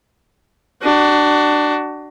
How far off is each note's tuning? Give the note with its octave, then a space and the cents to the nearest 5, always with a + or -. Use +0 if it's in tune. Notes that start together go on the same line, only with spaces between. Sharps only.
D4 +15 F#4 +30